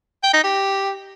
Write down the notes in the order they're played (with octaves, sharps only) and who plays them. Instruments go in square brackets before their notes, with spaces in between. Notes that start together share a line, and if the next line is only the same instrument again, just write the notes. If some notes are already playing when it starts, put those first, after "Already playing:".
[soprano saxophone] G5
D#4
G4